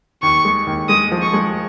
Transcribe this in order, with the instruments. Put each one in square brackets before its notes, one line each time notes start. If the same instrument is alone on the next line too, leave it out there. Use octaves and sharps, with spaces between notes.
[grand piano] D#2 [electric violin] C#6
[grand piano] G#3
D#2
[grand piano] G#3 [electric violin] D#6
[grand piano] F3
[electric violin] C#6
[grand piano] G#3